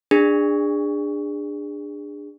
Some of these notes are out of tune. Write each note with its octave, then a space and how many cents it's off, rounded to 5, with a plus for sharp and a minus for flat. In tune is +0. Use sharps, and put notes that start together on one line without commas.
D4 +10 G#4 -25